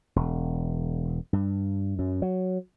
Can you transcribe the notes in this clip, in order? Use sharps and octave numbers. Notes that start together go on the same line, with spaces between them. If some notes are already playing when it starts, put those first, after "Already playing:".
E1
G2
F#2
F#3